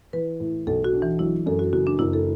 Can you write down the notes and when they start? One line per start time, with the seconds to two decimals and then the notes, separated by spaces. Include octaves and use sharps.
0.13 E3 B4
0.40 A2
0.67 B1 A4
0.84 F#4
0.93 D4
1.02 E3
1.19 F#3 E4
1.46 F#2 A4
1.59 F#4
1.73 F#1 F#4
1.87 D4
1.99 F#1 E4
2.13 A4